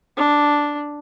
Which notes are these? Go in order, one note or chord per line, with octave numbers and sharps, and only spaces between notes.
D4